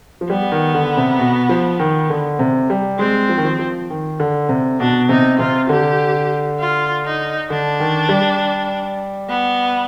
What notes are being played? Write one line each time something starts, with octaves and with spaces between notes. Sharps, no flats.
F3
G3 B3
D#3
D3
C3
B2
F3
D#3
D3
C3
G3
G#3 C4
F3
D#3
F3
F3
D#3
D3
C3
B2 D4
C3 D#4
C3 F4
D3 G4
F4
D#4
D3 D4
D#3
G3
B3